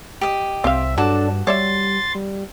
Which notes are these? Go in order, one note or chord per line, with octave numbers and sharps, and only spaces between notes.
G4 D#5
C2 C4 C5 E5 F5
G2 F#3 D4 F#4 A4 A5 D6
G3 C#5 D5 E5 C6 A6
G3